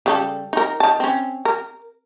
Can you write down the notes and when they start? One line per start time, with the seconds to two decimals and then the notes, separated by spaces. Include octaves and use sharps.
0.06 C#3 G3 A4
0.53 D#4 A#4
0.80 D#3 A5
1.00 C4 C#4
1.45 A#4